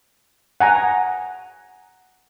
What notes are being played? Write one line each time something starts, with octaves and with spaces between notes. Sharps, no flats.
F#5 G#5 A#5